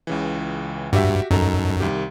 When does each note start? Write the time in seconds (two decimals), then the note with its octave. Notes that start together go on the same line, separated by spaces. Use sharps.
0.07 C#2 C#3 E3
0.93 G2 F#4 G4 E5
1.31 F#2 D#4 A4 A#5
1.80 C2 D#3 G4